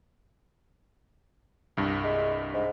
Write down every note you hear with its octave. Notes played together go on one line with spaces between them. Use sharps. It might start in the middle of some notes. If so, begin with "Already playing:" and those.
C2 G2
G#3
G#2